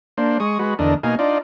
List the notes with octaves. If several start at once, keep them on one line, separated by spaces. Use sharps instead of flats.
A#3 D4 C5
G#3 C#6 D#6
G#3 F#4 B4
E2 D3 D4 A#4 D#5
B2 A#3 D#4 F5 G#5
D4 D#4 F4 D5